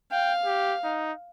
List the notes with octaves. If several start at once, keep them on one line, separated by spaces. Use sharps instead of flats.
F5 G5
G4
D#4